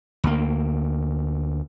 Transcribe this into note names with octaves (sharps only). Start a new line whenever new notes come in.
D2 A#3